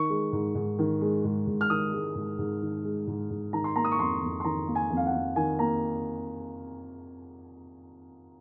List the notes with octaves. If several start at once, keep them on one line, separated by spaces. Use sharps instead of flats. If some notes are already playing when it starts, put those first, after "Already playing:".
Already playing: D#3 C#6
G#3
G#2
G#2
D#3
G#3
G#2
G#2
F6
D#3 D#6
G#3
G#2
G#2
D#3
G#3
G#2
G#2
D#3 A#5
C6
A#3 A#5
D#6
C#6
F2 C6
F2
C6
D#3 A#5
A#3
G#5
F2
F5
F#5
F2
D#3 G#5
A#3 A#5